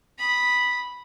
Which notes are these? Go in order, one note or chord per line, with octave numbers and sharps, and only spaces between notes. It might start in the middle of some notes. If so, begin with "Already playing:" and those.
B5 D#6